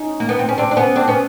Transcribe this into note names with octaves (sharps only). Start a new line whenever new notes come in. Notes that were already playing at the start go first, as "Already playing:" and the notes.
Already playing: C#4 D#4
A#3
B3
C4
C#4
C4 D4
D4
B3 C#4
C4 D4
B3 C#4